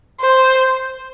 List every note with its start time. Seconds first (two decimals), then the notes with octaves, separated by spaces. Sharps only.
0.21 C5